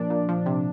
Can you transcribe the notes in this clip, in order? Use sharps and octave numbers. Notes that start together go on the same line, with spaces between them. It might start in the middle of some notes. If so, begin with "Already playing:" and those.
Already playing: A#2 F3 D4
A#2
F3
C3